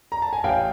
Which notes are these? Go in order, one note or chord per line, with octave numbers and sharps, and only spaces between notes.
A#5
A5
G#5
A1 F5 G5